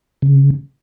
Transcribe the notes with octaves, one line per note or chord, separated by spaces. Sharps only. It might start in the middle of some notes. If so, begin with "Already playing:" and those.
C#3